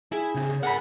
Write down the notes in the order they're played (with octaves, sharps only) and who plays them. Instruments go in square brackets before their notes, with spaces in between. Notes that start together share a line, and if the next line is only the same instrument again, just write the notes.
[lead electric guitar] E4 [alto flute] G#4 [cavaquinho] G#5
[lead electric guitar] C#3 C4
[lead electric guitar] A#4 G#5 [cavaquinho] F#5 B5